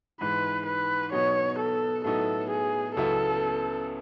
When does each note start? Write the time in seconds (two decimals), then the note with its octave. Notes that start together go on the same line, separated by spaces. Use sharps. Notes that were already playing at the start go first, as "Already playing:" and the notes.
0.21 G#2 E3 G#3 B4
0.66 B4
1.12 B2 F#3 B3 D#4 C#5
1.59 A4
2.04 A2 F#3 B3 D#4 A4
2.50 G#4
2.96 C#2 C#3 F#3 B3 E4 A4